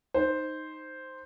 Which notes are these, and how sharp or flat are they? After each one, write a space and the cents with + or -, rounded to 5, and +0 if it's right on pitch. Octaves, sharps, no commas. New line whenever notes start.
D#4 +0 C5 +0